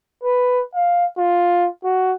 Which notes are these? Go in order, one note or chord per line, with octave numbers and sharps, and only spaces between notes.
B4
F5
F4
F#4